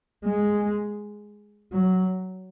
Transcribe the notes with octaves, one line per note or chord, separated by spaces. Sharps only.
G#3
F#3